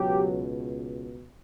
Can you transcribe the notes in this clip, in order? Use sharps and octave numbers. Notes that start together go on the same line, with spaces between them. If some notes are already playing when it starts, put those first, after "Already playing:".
Already playing: C#2 B2 F#3 G4